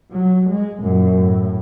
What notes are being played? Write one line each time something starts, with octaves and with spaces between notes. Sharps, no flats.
F#3
G#3
F#2 A#2
A2